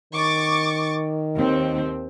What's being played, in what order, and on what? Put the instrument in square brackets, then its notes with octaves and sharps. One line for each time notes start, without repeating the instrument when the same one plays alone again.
[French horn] D#3 [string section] C#6 D6 A6
[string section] D#2 C4